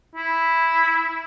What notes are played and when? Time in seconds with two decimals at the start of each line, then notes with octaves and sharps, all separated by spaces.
0.15 E4